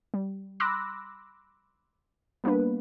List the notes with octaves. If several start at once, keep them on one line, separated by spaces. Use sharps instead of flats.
G3
B5 C6 D6 E6 F#6 A#6
G3 A#3 B3 D4 B4